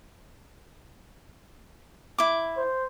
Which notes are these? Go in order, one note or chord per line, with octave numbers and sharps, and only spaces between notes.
E4 D6
C5